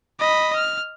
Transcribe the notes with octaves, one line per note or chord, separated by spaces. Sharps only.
D#5 B5
F6